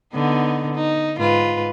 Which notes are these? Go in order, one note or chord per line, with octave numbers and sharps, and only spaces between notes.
D3 B3 D#4
D#4
G#2 F4 B4